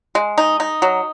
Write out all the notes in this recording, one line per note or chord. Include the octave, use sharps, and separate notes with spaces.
G#3
D#4
D#4
F#3